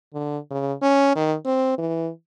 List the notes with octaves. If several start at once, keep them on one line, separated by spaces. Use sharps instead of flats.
D3
C#3
C#4
D#3
C4
E3